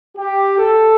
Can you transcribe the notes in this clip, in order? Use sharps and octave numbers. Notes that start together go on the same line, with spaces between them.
G4
A4